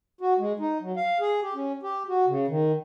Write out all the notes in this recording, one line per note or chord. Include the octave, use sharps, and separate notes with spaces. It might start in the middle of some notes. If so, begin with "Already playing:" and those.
F#4
G#3
D#4
F#3
F5
G#4
G4
C#4
G4
F#4
C#3
D#3